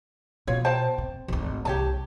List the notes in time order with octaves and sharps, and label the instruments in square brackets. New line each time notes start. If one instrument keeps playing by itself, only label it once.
[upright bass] B2 [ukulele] F4 C#5
[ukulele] C5 G5 A5
[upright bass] C4
G#1 D2
[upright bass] C2 [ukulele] G4 C#5 A5